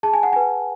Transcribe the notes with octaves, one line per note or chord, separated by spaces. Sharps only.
G#4 A5
G#5
F#5
B4 G#5